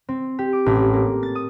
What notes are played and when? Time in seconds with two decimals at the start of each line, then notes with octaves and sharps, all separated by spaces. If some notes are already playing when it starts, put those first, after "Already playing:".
0.09 C4
0.39 G4
0.53 D6
0.66 A1
0.93 A#3
1.23 A6
1.35 D#6